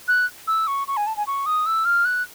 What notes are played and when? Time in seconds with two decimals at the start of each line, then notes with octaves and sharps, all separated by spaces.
0.08 F#6
0.47 E6
0.67 C#6
0.88 C#6
0.97 G#5
1.07 A5
1.17 G#5
1.27 C#6
1.46 D#6
1.66 E6
1.85 F6
2.05 F#6